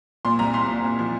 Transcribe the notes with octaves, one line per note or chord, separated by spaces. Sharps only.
A#2 C6
C2 A#5
C2 C6
A#2
A#2
F3